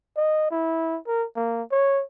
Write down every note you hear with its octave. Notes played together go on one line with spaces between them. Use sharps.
D#5
E4
A#4
A#3
C#5